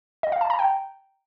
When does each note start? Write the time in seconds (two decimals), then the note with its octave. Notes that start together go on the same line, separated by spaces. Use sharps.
0.23 D#5
0.32 F5
0.41 A5
0.50 A#5
0.59 G5